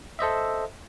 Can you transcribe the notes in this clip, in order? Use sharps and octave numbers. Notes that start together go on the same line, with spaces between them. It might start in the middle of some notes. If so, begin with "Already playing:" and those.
A4 C5 D#5 E5